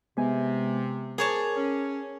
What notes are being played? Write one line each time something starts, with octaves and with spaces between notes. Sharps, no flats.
C3 G#3 B3 G#5
G#4 A#4 C#5 A5 D6
C#4